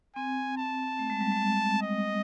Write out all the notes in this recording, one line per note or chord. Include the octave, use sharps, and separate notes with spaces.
C4 G#5
A5
A3
G#3
G3
G#3
D#5